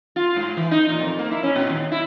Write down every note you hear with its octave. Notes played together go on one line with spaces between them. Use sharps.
F4
G#2
E3
D#4
A#2
F2
A#3
E4
C#4
A#2
D#2
E4